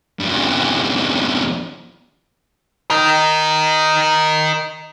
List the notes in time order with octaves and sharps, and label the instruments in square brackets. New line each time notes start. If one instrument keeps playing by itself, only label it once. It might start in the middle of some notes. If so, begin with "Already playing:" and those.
[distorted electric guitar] E2 G2
[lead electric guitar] A#4 D#5